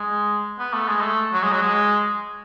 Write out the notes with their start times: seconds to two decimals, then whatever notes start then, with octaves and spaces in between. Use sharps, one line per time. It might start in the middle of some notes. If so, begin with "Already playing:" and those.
Already playing: G#3
0.59 B3
0.73 A3
0.87 G#3
1.00 A3
1.33 F#3
1.43 G#3
1.52 F#3
1.62 G#3